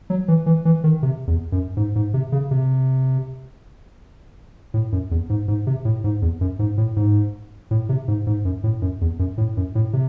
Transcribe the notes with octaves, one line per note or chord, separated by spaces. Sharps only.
F#3
E3
E3
E3
D#3
C3
E2
F#2
G#2
G#2
C3
C#3
C3
A2
F#2
E2
G#2
G#2
C3
A2
G#2
E2
F#2
G#2
A2
G#2
A2
C3
G#2
G#2
F#2
A2
F#2
E2
F#2
A2
F#2
A2
C3